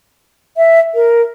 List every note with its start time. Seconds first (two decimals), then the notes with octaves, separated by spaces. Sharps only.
0.57 E5
0.95 A#4